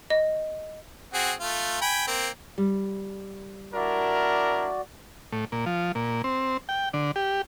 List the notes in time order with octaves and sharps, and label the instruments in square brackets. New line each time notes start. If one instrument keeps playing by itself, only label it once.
[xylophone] D#5
[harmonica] C4 F#4 G#4
A3 F4
G5 G#5 B5
A#3 C4
[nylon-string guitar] G3
[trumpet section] D4 E4 A#4 [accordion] F#4 D5
[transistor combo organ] A2
A#2
F3
A#2
C4
G5
D3
G4